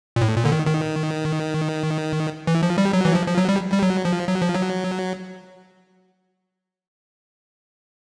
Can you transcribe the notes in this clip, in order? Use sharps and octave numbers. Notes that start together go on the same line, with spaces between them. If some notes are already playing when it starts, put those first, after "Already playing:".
A#2
A2
A#2
D3
D#3
D#3
E3
F3
G3
F#3
E3
F3
F3
F#3
G3
G3
F#3
F3
F#3
F3
F#3